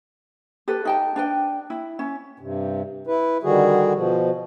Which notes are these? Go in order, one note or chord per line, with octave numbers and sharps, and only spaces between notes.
G4 A4 B4
D#4 G5 A5
D4 B4 G5
E4
C#4
G2 C3
E4 B4
D3 D#3 G3 F#4 G#4
B2 F3